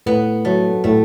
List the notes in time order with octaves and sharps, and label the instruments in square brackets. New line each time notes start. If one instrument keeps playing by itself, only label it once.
[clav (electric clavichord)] A2 [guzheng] B3
[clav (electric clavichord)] F#3 [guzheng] A3
[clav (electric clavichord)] A2 [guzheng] A3